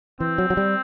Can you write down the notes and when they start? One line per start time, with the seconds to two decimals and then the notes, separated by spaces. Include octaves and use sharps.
0.20 E3 C4
0.38 F#3
0.50 F#3
0.57 G3